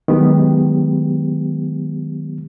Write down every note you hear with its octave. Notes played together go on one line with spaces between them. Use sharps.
D#3 F#3 G#3 B3 G4